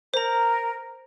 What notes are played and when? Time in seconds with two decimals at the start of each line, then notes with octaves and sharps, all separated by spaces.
0.14 A#4 C5 A#5